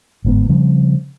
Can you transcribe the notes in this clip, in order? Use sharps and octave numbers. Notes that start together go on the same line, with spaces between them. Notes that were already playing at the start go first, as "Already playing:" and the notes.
G1 G#2 B3
C#3 F3 G3 C4